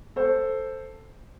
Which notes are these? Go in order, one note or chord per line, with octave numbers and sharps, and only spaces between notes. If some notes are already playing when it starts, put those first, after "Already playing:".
A4 C5